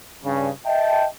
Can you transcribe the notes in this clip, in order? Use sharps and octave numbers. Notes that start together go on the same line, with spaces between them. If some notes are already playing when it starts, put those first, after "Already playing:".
G2 C#3
D#5 E5 G5 A5